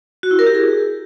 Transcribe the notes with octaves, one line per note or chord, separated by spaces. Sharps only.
F#4
E4
A#4
G4
G#4